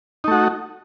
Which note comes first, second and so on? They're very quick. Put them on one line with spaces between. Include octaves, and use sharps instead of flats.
D#4 A3 F#4